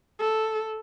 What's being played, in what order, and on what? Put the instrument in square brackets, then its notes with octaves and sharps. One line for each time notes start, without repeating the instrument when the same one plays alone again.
[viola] A4